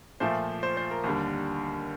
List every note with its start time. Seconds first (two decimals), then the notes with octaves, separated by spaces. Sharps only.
0.20 A#2 F3 A3 C5
0.63 C5
0.77 C5
0.91 A#4
1.04 D#2 D3 G3